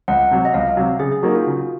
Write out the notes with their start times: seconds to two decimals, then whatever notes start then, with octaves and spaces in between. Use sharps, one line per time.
0.08 C#2 F#5
0.31 C3 F#3
0.45 D#5
0.54 C#2 F5
0.77 C3 F#3
1.00 C#3 G#4
1.12 G#4
1.23 F#3 A#3 D#4 F#4
1.35 F4
1.47 C#3